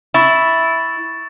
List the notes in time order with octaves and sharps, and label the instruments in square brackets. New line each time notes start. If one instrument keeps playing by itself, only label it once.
[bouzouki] E4 [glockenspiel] C#6 A6 E7